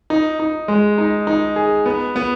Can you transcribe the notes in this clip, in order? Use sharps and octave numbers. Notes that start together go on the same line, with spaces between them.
D#4
D#4
G#3
D#4
D#4
G#4
B3
B3